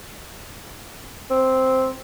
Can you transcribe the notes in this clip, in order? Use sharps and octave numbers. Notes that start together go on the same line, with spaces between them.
C4